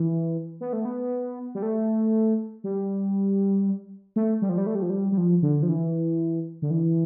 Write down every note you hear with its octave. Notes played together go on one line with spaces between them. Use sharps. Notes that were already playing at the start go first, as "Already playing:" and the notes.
Already playing: E3
B3
A3
B3
G3
A3
G3
A3
G3
F3
G3
A3
G3
F3
G3
G3
F3
D3
F3
E3
D3
E3